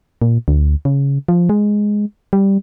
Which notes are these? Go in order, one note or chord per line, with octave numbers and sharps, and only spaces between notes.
A#2
D2
C#3
F3
G#3
G3